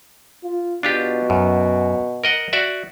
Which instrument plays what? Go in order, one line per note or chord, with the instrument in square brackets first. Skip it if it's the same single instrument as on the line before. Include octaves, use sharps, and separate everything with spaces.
[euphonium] F4
[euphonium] B2 [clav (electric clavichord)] D4 F4 G4
[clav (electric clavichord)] F#2
A#4 D#5 F#5
F#4 D5 E5